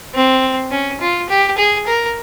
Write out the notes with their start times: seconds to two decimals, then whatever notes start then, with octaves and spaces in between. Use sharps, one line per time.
0.14 C4
0.71 C#4
1.00 F4
1.29 G4
1.57 G#4
1.86 A#4